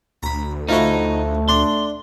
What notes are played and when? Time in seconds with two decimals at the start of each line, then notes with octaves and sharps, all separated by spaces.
0.23 D2 A#5 B5
0.69 F3 A3 D#4 E4 F#4
1.49 D4 C6